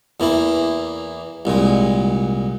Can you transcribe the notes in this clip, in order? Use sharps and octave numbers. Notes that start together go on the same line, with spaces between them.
E2 E3 A#3 E4
C2 A#2 G#3